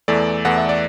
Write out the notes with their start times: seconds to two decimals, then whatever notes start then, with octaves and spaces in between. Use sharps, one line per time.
0.08 E2 E3 A3 A4 D5
0.45 E2 E3 A3 F#5
0.58 E5
0.69 D5